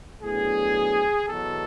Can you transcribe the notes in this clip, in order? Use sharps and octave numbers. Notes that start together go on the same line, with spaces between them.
A2 F#3 B3 D4 G#4
E2 B2 F#3 A4